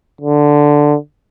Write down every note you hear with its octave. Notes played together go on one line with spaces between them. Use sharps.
D3